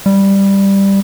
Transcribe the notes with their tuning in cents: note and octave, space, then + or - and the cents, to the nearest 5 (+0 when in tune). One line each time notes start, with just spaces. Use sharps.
G3 +5